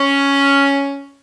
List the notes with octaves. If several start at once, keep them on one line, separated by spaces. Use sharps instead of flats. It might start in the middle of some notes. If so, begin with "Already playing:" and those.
Already playing: C#4